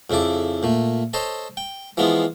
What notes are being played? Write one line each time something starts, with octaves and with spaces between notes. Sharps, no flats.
F2 C#3 E4 A4 D6
A#2 A3
A4 C5 C#5 D#5 A5
G5
E3 F3 G#3 B3 E4 F4